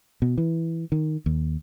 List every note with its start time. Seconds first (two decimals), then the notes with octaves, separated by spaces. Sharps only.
0.22 B2
0.38 E3
0.92 D#3
1.26 D#2